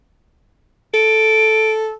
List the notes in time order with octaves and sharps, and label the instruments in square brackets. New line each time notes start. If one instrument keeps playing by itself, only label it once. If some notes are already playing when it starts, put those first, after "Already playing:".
[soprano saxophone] A4 [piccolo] D7